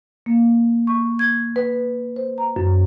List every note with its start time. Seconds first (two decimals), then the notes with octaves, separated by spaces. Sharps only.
0.26 A#3
0.87 C#6
1.19 G#6
1.56 B4
2.16 C5
2.38 A#5
2.56 F#2